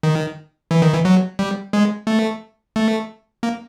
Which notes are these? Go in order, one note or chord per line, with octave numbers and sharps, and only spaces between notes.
D#3
E3
D#3
E3
F#3
G3
G#3
A3
A3
A#3